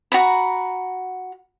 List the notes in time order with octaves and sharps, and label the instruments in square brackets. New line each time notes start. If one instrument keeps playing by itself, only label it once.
[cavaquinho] F#4 A#5 B5